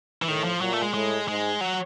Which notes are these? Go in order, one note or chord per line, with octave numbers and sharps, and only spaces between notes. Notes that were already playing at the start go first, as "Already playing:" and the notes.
E3
A2 D#3
F3
A#2 F#3
A3
G#3
A2 G#3
G#2 G#3
F#3